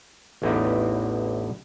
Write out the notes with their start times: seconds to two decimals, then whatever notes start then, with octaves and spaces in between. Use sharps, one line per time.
0.42 A1 E2 A2 D3 D#4 E5